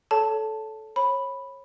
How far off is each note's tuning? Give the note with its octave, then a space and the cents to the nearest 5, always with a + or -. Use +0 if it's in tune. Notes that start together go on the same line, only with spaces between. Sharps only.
A4 -15 C#5 +25 A5 +0
C#5 -30 B5 +0